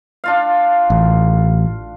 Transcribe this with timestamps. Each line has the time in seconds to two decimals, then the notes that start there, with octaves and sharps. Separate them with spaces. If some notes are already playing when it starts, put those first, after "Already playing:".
0.24 D4 F4 F5
0.90 A1